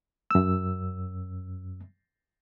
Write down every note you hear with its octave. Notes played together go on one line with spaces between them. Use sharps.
F#2 E6